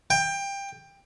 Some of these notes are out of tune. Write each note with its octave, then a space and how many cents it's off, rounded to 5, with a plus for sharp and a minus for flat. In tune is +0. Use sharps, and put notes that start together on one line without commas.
G5 +20